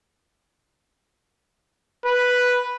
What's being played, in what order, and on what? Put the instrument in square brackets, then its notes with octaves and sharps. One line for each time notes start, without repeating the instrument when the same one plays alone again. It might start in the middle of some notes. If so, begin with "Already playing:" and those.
[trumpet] B4